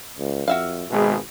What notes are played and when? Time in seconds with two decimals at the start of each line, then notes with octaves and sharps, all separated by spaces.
0.19 C#2
0.48 F2 F#4 E5 F5
0.91 G#1 B2 G#3 G#4